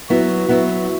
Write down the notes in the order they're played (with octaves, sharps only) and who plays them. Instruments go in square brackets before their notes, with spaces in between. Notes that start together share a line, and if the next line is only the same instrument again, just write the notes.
[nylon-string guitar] F#3 B3 E4 [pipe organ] F#4
[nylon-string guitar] F#3 B3 E4